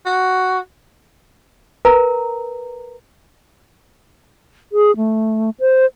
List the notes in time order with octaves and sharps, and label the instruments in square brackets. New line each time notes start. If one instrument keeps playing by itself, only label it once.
[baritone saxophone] F#4
[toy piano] A#4 B4 A#5
[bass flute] G#4
A3
C5